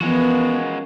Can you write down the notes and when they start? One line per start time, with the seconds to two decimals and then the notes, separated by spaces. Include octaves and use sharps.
0.01 E3 F3 G#3 A#3 B3 C#4 F#4